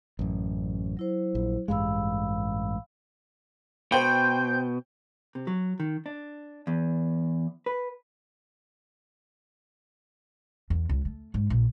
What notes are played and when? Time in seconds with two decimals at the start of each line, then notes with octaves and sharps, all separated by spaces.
0.19 A1 F#2
0.97 F#3 E4 C5
1.35 A#1
1.68 A1 G2 G#3 F5 B5 E6
3.92 B2 C5 G5 G6
5.35 C3
5.47 F#3
5.80 D#3
6.06 D4
6.67 E2
7.66 B4
10.70 E2
10.89 C#2
11.05 A3
11.34 G#2
11.50 A#1